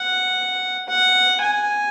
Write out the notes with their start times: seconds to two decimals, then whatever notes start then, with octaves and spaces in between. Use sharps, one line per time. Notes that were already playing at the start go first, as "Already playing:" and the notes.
Already playing: F#5
0.88 F#5
1.41 G#5